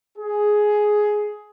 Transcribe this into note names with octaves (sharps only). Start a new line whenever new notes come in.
G#4